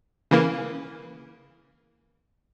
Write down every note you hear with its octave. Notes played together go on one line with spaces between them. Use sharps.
C#3 E3 A#3